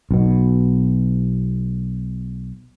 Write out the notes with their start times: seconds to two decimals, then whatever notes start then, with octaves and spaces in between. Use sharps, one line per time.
0.11 B1 B2